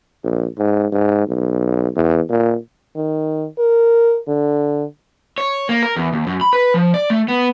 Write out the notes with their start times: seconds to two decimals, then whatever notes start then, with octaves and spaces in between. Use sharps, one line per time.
0.24 A#1
0.58 G#2
0.93 G#2
1.28 B1
1.96 E2
2.30 A#2
2.96 D#3
3.59 A#4
4.28 D3
5.38 C#5
5.69 A#3
5.83 A#4
5.96 E2
6.13 D#2
6.27 F#2
6.41 B5
6.53 B4
6.74 F3
6.94 D5
7.10 A3
7.28 B3